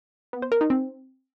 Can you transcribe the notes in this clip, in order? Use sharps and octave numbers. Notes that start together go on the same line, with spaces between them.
B3
C5
A#4
D#4
C4